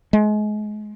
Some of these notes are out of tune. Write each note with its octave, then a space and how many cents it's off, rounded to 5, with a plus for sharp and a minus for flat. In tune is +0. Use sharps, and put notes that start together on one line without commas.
G#3 +30